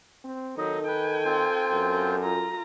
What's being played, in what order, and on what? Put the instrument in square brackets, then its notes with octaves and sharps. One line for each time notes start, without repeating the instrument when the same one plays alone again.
[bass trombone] C4
[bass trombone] D#3 [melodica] F#3 D#5 [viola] D#4 [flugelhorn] A4
[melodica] B4 [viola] G5 G#5
[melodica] C4 F4 C5
[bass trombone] F#2
[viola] F4 A#5